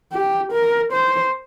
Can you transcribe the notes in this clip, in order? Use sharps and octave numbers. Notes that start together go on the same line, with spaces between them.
G4
A#4
C5